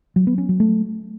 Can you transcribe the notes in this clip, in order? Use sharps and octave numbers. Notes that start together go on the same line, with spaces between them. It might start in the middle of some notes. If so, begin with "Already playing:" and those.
F#3
B3
C#4
F#3
A3